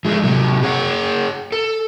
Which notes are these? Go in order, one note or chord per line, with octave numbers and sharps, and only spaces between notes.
F3 G#3 A3
C3 F#3
G#4 C#5 F#5 G5
A4